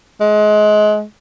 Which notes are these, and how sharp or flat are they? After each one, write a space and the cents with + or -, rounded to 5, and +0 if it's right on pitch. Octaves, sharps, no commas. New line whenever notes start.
G#3 +30